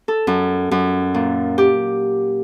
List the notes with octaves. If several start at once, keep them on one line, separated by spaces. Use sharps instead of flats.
A4
F#2
F#2
A#2
G4